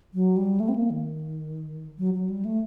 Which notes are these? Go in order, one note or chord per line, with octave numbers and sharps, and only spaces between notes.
F#3
G3
A3
C4
A#3
D#3
F#3
F#3
G3
A3